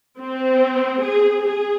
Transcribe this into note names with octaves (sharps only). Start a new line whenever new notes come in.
C4
G#4
G#4